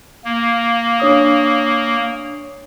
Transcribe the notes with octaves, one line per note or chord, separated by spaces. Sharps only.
A#3
D4 C#5 D#6